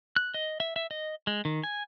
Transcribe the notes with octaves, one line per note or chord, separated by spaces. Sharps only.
F#6
D#5
E5
E5
D#5
G#3
D#3
G#5